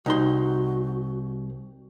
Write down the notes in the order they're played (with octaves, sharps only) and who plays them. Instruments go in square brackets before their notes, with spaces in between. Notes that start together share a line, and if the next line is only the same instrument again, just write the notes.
[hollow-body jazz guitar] C2 D#4 C6 [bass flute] F#4